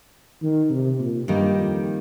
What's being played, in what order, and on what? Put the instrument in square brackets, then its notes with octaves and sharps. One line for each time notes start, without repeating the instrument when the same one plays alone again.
[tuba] D#3
C3
A#2
[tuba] G2 [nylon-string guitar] D#3 G3 A#3 D#4
[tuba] F2